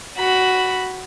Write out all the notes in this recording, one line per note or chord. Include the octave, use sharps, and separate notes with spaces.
F#4 B5